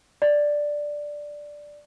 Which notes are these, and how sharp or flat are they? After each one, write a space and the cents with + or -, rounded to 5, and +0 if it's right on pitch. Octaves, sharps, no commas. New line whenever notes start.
D5 +5